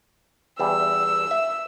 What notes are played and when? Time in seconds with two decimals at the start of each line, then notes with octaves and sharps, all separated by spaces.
0.60 E2 G3 E6
1.31 E5